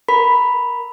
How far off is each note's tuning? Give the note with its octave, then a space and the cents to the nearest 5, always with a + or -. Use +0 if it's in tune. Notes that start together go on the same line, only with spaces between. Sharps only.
A#4 +10 B5 +0